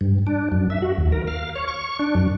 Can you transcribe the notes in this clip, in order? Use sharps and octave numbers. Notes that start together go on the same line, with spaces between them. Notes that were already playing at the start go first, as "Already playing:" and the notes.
G2
D4
F#2
E5
F#4
D#2
A#4
F5
C#5
C#6
D4
F#2